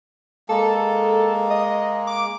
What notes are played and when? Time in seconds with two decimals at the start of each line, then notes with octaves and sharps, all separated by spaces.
0.49 G#3 A#3 A4
1.50 D#5
2.07 D6